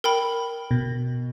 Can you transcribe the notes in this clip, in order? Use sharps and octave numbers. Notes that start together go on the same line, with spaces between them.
A#4 G5 B5
B2